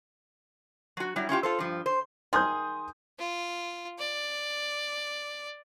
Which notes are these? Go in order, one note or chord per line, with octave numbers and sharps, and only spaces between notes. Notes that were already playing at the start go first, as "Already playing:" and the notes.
F#3 F#4
F#3 G3 E4
C#4 E4 F4 G4
F4 A4 C5
G2 F3
C5
D#3 G#4 C6 D#6 G6
F4
D5